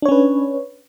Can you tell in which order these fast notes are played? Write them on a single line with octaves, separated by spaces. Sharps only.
D4 C#5 C#4 B4